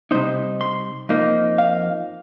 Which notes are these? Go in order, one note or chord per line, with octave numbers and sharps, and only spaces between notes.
C3 G3 C4 D#4 C5
C6
F2 F3 A#3 D#4
F5